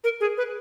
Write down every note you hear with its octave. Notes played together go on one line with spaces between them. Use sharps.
A#4
G#4
B4